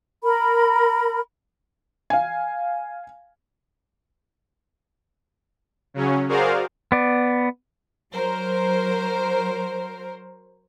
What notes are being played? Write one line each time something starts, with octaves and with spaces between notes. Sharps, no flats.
A#4 B5
F5 G#5
C#3 F#3 C#4
F#4 G#4 A#4 C5 D5 F5
B3 D5
F#3 A#4 C5